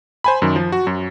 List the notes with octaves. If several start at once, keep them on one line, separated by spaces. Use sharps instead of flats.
C5 G#5 B5
F#2 D#3
F3
F#4
F#2